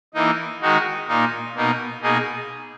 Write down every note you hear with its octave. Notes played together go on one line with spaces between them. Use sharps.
E3 A#3 D#4
D#3 G#3 D#4 F#4
A#2 A#3 D#4
B2 A#3 D#4
B2 A#3 D#4 G#4